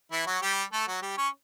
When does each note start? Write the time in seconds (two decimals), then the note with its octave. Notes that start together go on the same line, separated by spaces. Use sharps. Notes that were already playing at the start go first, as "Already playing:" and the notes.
0.12 E3 E4
0.27 F#3 F#4
0.42 G3 G4
0.72 A3 A4
0.87 F#3 F#4
1.02 G3 G4
1.18 C#4 C#5